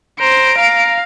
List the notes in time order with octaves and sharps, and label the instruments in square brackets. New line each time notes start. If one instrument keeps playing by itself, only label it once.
[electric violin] C5 [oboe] A#5 [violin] D7
[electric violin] F5 [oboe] A#5